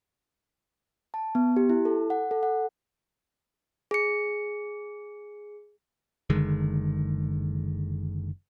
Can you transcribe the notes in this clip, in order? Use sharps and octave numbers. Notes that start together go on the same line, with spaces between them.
A5
B3
G4
E4
A4
F#5
A4
F#5
G#4 C#7
F#1 D3 D#3 G#3